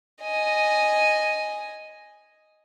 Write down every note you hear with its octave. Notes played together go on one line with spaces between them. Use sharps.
D#5 G#5